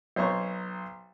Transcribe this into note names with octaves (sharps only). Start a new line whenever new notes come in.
B1 C5 C#5 A#5 C#6